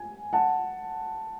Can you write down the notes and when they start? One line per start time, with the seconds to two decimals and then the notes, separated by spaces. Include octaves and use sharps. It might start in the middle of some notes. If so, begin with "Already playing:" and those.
Already playing: G#5
0.33 F#5 A5